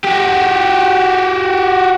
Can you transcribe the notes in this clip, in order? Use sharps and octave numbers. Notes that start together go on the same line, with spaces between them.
F#4 G4